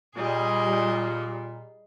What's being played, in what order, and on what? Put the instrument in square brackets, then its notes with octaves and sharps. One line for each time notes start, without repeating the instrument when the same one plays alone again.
[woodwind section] A#2 [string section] G3 [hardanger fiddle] G#4 D#5